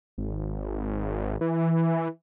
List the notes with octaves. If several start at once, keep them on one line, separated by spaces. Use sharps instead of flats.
G#1
E3